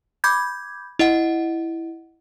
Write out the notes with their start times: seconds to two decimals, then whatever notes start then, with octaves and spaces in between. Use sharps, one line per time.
0.24 B5 D6 G6 G#6
0.99 E4 D#5 F#5